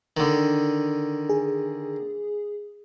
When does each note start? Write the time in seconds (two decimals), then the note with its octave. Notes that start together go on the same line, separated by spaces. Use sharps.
0.17 D3 D#3
1.29 G#4